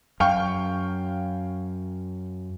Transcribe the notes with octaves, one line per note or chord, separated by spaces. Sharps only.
F#2 F5 G5 C#6